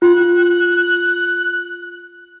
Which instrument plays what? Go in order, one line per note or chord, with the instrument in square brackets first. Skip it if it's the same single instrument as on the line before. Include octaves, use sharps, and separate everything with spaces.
[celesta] F4 [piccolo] F#6